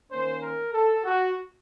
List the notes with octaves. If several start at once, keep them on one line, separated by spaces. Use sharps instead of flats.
D#3 A#3 C#4 C5
A#4
A4
F#4